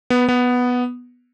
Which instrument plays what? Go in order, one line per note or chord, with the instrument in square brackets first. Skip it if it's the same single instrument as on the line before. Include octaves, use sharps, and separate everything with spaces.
[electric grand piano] B3
B3